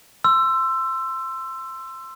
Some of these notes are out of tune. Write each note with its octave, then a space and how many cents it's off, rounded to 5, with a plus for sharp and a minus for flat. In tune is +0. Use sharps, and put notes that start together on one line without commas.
C6 +0 E6 +20